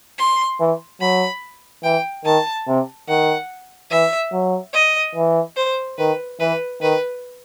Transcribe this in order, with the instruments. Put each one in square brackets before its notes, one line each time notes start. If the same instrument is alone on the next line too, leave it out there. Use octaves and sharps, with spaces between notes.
[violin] C6
[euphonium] E3
[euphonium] F#3 [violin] B5
[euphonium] E3 [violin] G5
[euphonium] D#3 [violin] A5
[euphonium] C3
[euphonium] D#3 [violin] F#5
[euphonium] E3 [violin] E5
[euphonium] F#3
[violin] D#5
[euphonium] E3
[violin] C5
[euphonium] D#3 [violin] B4
[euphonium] E3 [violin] B4
[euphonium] D#3 [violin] B4